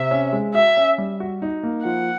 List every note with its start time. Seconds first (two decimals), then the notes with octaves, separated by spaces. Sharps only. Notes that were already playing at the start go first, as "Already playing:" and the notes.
Already playing: C3 E5
0.11 C#4
0.33 G#3
0.54 F#4 E5
0.77 C#4
0.98 G3
1.20 F#4
1.42 D#4
1.63 A#3
1.84 F3 F#5